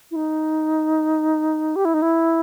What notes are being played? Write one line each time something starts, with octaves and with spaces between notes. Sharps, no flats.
E4
D#4
G4
E4
D#4
E4